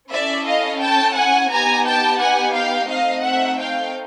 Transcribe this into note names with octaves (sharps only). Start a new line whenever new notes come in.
C#4 E4 A4 D5 E5
D#5 F5
G5 A5
F#5 G#5
B3 D#4 G4 G#5 A#5
G5 A5
F#5 G#5
F5 G5
A3 C4 D#4 D#5 F5
E5 F#5
F5 G5